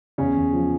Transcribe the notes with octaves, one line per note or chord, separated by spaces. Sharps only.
E2 C#3 C#4
E2
F3